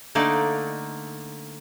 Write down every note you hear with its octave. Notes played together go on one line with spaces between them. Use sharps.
D3 A3 A#3 D#4 D5